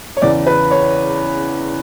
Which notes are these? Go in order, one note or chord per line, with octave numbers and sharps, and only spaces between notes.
C#5
E2 C#3 E3 D5
B4
C#5